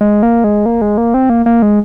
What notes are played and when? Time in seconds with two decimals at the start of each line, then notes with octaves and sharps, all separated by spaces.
0.01 G#3
0.23 A#3
0.44 G#3
0.66 A#3
0.82 G#3
0.98 A#3
1.14 C4
1.30 A#3
1.46 A#3
1.62 G#3